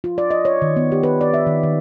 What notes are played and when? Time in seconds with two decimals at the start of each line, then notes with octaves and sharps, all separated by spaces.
0.04 F4
0.18 D5
0.31 D#5
0.45 C#5
0.62 D#3
0.76 B3
0.92 G4
1.03 B4
1.21 D5
1.34 E5
1.47 D#3
1.63 D#3